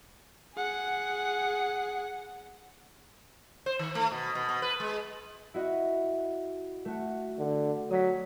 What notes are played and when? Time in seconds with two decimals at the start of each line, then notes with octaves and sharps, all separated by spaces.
0.55 G#4 F#5
3.66 C5
3.79 D#3
3.95 A3
4.11 B2
4.35 B2
4.49 B2
4.62 B4
4.80 G#3
5.54 E4 F#4 D#5
6.85 A3 F#4
7.39 D3
7.91 F#3 D#6 B6